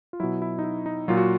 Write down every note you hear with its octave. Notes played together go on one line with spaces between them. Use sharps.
F4
B2 F#3 E4
E4
D#4
E4
D#4
A#2 F#3 F4
F#4